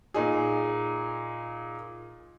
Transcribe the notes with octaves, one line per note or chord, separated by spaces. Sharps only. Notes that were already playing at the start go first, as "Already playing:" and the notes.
A#2 D#4 G#4